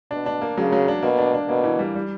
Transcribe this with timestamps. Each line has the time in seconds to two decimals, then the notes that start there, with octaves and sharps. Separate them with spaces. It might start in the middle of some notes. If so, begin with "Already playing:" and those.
0.11 B2 D4
0.26 D4
0.41 A#3
0.57 C#3 F#3
0.72 F#3
0.88 D4
1.02 B2 A#3
1.18 D4
1.34 D4
1.48 B2 A#3
1.64 E3
1.79 G3
1.95 G3